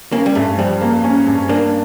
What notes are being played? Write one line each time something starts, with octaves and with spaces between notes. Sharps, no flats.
A#3 C#4
G3
G2 A3
F3 G3
A#3
C#4
G2
A#3 D4